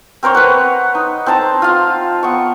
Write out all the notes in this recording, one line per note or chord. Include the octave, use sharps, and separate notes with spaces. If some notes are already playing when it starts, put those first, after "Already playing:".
C4 A#4 C5 C#5
B4 F#5
D#4
C4 C5 A5 A#5
F4 F5
B3 C#6